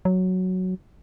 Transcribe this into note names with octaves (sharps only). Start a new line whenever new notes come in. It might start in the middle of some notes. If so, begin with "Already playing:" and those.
F#3